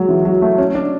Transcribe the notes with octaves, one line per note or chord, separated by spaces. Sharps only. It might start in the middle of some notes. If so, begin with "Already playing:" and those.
Already playing: F#3 G#3
E3
F#3
A3
C#4
D4